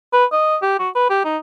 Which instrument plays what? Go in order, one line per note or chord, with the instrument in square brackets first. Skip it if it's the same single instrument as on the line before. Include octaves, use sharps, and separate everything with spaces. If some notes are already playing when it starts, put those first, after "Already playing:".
[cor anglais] B4
D#5
G4
F#4
B4
G4
D#4